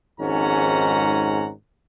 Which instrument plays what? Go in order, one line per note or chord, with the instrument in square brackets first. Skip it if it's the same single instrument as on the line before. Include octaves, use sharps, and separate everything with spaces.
[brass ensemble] G#1 F2 G#2 C#4 F#5 A#5